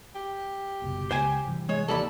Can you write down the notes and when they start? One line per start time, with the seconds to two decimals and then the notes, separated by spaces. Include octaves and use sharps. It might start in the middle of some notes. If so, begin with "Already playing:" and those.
0.15 G4
0.82 F#1 C2 B2
1.11 C#2 C5 G5 G#5
1.47 C3 E3 G3
1.69 G#3 C#5
1.88 D#2 A4 D5 B5